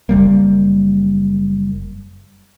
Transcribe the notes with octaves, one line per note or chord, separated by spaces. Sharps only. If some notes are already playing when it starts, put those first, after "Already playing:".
F#1 G3 A#3